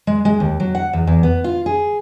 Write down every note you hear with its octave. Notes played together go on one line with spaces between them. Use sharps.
G#3
G#3
D#2
F#3
F#5
E2
E2
B3
F4
G#4